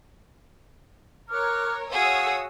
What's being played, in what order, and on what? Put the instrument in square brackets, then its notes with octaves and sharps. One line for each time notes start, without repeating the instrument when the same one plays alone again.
[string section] A#4 C#5 [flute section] D6 F6 F#6
[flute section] F#4 F5 F#5 [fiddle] G#4 [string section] C#5 D#6 E6